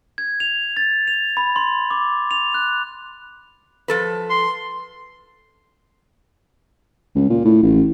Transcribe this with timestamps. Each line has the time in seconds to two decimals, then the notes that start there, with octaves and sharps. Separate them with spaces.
0.18 G#6
0.40 F7
0.77 A6
1.08 F7
1.37 B5
1.56 C6
1.91 D6
2.31 F7
2.54 F#6
3.88 F3 A4 B4
4.30 C6
7.15 C#2
7.30 A#2
7.45 A2
7.63 A1